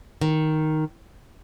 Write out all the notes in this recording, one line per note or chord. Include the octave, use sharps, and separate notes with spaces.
D#3